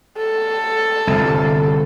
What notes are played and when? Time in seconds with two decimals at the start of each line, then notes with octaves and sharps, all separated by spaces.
0.18 A4
1.07 G1 C2